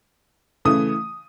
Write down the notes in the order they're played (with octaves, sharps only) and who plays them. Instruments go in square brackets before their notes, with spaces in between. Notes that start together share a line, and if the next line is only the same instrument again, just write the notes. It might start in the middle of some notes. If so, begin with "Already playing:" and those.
[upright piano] C#3 E3 A3 D#6